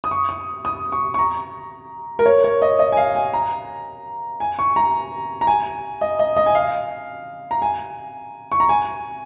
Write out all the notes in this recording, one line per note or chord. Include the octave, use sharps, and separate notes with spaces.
D#6
C#6
D#6
D#6
C#6
C#6
A#5
A#4
C#5
C#5
D#5
D#5
G#5
F5
G#5
A#5
G#5
C#6
A#5
A#5
G#5
D#5
D#5
D#5
G#5
F5
A#5
G#5
C#6
A#5
G#5